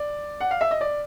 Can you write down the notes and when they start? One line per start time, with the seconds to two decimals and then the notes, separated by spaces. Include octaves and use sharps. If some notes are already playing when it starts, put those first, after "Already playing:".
Already playing: D5
0.40 F#5
0.51 F5
0.61 E5
0.71 D#5
0.81 D5